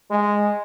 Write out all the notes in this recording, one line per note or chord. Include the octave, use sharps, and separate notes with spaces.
G#3